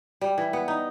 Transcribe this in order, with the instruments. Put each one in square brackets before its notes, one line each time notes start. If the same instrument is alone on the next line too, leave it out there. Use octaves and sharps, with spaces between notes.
[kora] G3
E3
B3
D#4